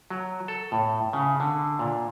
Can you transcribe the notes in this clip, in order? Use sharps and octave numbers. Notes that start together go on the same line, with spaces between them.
F#3
A4
A2
C#3
D3
A#2